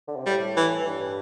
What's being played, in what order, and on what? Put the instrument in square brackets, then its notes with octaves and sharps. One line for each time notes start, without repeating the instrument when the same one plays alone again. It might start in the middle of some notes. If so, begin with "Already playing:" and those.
[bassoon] D3
C3
[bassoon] A2 [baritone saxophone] G3
[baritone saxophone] E3
[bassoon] G2